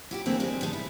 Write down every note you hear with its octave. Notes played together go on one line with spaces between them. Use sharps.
E4 F#4 G4
D3 E3 A3 A#3 C4 G#4
D#3 G3 G#3 C4
B2 D#3 D#4 A4
E4